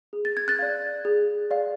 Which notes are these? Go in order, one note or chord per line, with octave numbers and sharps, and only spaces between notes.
G#4
A6
G#6
F#6 A6
D5 F5
G#4
D5 F5